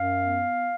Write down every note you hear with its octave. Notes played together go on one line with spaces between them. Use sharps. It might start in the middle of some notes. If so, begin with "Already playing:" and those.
Already playing: F#2 F5
B3